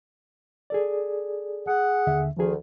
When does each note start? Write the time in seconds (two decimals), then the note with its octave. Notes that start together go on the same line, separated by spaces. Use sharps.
0.70 G#4 A4 D5
1.67 G#4 F#5
2.07 D#2 D3 E5
2.37 D2 D#3 F3 G#4